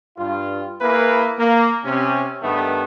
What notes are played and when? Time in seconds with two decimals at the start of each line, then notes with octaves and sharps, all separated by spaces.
0.17 G2 F4
0.81 A#3 E4 G#4 B4
1.38 A#3
1.84 C3 C#4
2.42 G2 D#3 A3 B3